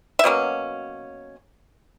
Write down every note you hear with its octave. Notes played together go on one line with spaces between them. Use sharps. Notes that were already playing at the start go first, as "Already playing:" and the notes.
E5
B2 F#3 A#3 C#4